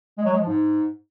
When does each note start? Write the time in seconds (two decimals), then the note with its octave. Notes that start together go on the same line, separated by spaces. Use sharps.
0.18 G#3
0.25 F#3
0.32 G#3
0.40 F3
0.47 G#2